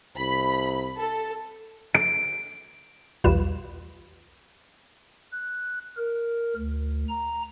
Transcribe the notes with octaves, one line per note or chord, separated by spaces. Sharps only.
C2 B5
A4
D7
B1 E2 G3 F4 B4 E7
F#6
A#4
D2
A#5